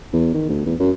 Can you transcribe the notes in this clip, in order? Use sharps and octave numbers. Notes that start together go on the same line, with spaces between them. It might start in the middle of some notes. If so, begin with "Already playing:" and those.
E2
D#3
D2
E2
F#2